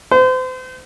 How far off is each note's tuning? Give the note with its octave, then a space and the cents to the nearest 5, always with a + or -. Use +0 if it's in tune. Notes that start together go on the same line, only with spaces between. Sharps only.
C5 -35